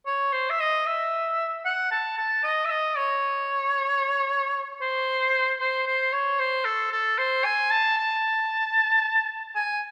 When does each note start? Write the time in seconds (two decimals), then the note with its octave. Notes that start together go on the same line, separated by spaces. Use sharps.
0.06 C#5
0.32 C5
0.50 E5
0.60 D#5
0.86 E5
1.65 F#5
1.91 A5
2.18 A5
2.43 D#5
2.65 E5
2.70 D#5
2.97 C#5
4.81 C5
5.60 C5
5.87 C5
6.13 C#5
6.39 C5
6.65 A4
6.92 A4
7.18 C5
7.44 G#5
7.71 A5
7.97 A5
9.55 G#5